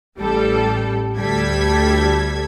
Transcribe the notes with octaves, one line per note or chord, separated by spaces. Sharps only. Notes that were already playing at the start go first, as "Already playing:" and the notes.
A1 G3 A4
D2 G3 A4 G#6 B6